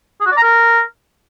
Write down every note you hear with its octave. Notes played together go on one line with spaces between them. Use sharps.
G#4
F#4
D5
A#5
A#4